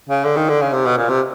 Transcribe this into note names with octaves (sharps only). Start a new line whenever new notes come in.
C#3
D3
D#3
D3
C#3
C3
B2
A#2
C3